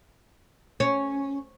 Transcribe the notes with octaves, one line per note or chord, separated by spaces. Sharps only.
C#4